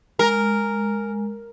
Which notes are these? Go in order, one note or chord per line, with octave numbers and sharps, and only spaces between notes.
G#3 A#4